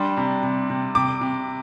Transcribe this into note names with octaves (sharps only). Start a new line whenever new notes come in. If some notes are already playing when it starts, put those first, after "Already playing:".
Already playing: G3 D4 C6
C3
C3
C3
C3 D6
C3